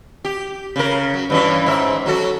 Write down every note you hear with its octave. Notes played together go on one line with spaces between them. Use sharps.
G4
C#3 A#4
F#3
G2 E3 C#4
G#2 E5
F#3 F#4 A4